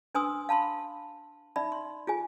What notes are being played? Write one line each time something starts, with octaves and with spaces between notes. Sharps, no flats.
D4 B4 G#5 C6 D#6 E6
F5 A5 B5 C6
D#4 D5 E5 B5
C6
F4 G#4 G#5